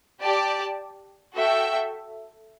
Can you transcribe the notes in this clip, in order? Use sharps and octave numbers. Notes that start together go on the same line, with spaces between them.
G4 D5 A5
F#4 A4 E5 G5